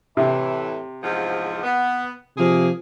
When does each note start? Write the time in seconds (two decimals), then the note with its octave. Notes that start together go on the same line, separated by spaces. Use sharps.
0.17 A2 C3 E3
1.03 E2 G#2 F3
1.63 B3
2.38 C3 F3 A#3 G#4